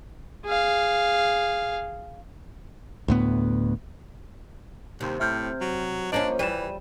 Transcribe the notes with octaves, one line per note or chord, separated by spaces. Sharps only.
G#4 F5
D2 A2 B3
D#2 C3
A2 E5 F6 G6
F#3
F3 A#3 C#4 D4 D#5 A#5
E2 E3 G3 D#7 E7